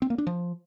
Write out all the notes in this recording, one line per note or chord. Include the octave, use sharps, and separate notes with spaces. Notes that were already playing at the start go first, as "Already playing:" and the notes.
C4
A#3
D4
F3